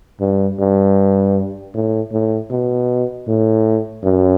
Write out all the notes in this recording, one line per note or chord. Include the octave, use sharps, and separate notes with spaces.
G2
G2
A2
A2
B2
A2
F#2